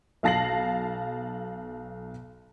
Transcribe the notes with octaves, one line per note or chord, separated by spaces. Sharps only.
B1 F5 A5 A#6 C7 F#7